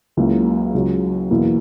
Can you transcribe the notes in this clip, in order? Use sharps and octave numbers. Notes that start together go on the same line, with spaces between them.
C#2 C#3 F#3 A#3 E4
C#2 C#3 F#3
E2 B2 A#3 E4